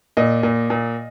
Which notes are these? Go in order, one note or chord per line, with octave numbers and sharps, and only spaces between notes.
A#2 D#5
A#2
A#2